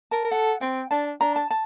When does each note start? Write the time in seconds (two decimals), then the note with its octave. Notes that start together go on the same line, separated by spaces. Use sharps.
0.11 A#4 A5
0.25 A#4
0.31 A4 F#5
0.61 C4 G5
0.91 D4 A5
1.21 D4 A#5
1.36 A5
1.51 A5